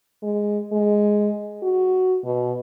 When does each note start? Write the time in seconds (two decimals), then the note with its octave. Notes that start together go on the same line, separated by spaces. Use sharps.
0.23 G#3
0.72 G#3
1.63 F#4
2.25 B2